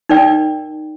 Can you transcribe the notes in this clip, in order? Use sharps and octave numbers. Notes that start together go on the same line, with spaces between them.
D#4 A#4 D5 G5